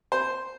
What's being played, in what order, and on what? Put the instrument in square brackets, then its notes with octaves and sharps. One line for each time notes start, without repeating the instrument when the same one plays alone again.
[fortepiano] C5